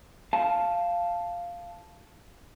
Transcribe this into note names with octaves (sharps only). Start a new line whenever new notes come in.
F5 A5